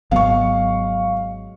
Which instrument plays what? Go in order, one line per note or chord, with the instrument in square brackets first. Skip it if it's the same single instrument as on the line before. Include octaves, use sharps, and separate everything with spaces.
[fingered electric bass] G#1 B3 [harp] F#3 G#3 [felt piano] F5 C#6